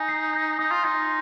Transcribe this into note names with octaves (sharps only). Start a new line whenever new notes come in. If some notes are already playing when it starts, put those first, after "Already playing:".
Already playing: D#4 G#5
C7
G6
D#4 D#6
F4
D#4 C6